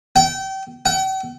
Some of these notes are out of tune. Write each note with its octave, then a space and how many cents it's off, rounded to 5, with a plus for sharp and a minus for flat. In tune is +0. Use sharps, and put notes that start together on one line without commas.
G5 -30
G5 -45